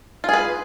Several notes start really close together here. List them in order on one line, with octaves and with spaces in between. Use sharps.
F4 G#4 B4